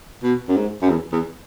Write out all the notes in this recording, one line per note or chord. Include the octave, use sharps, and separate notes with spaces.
B2
F#2
G#2
F#2
E2
E2